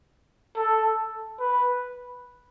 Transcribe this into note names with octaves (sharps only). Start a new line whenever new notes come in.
A4
B4